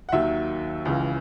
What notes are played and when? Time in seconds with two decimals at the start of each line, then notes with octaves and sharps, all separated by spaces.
0.09 F#5
0.12 D#2 D#3 F#3 E5
0.85 C#2 C#3 E3